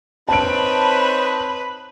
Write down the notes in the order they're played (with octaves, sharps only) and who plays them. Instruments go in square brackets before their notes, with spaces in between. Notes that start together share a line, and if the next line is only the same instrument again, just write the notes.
[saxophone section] C4 D#4 C#5 [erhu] B4 [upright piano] A5 D7